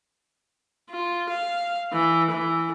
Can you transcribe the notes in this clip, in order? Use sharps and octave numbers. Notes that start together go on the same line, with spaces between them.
F4
F5
E3
E3